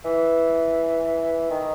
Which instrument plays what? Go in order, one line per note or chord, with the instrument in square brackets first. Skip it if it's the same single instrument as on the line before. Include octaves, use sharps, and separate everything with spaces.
[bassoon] E3
D#3